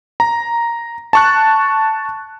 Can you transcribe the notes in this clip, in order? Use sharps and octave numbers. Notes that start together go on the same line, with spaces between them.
A#5
A5 C#6 F#6